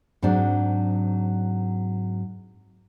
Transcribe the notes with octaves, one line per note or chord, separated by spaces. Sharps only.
G#2 F#3 C4 D4